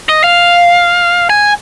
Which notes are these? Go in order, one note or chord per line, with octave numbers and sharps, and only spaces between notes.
D#5
F5
G#5